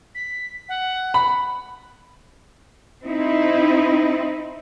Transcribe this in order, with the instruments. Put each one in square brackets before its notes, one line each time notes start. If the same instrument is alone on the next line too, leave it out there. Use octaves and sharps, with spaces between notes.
[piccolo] B6
F#5
[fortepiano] B5
[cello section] C4 D#4 E4